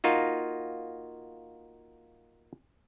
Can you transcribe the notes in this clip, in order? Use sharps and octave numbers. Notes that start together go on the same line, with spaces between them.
A#3 D#4 F4 F#4